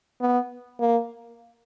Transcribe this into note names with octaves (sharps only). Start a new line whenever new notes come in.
B3
A#3